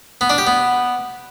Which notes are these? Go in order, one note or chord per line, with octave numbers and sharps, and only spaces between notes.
B3
D4
G4
B3